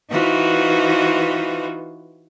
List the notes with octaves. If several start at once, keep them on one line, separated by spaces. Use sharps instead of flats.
E3 D#4 F4 F#4 B4 C5